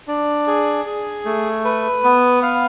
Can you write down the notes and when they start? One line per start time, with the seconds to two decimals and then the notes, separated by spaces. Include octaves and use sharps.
0.08 D4
0.47 G#4
0.87 G#4
1.26 A3
1.65 B4
2.04 B3
2.43 F5